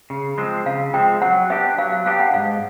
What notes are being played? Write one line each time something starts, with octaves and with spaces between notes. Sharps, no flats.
C#3
F3 G#3 C4
C#3 F5
F3 G#3 C4 G5
F#3 F#5
B3 D4 G4 E5
F#3 F5
F5
B3 D4 G4 F5
F#5
G#2 F5